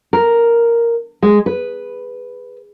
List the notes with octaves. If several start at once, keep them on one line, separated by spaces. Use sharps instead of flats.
A#4
G#3
B4